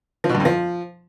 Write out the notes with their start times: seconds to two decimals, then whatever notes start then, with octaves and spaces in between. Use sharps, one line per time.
0.24 F3
0.29 B2
0.35 G2
0.40 F2
0.45 F3